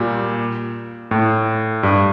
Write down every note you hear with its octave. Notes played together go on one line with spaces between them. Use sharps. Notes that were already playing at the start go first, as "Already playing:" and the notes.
Already playing: A#2 G3
A2
G2